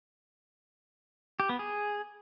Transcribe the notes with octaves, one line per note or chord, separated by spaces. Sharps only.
G4
B3
G#4